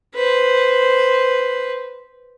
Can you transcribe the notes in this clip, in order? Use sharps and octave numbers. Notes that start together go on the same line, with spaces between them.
B4 C5